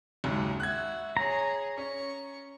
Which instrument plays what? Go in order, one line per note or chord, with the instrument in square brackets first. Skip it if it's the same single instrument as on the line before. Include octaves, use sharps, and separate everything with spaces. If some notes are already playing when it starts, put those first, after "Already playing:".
[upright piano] F#1 D#2 G#2
[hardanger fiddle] F#4 E5 [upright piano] F#6 G#6
[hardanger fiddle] G#4 C#5 [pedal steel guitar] A#5
[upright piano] C#4 [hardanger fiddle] C#6